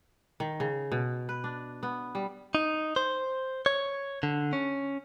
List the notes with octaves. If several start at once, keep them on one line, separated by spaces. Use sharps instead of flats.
D#3
C#3
B2
B4
D4
B3
G3
D#4
C5
C#5
D3
C#4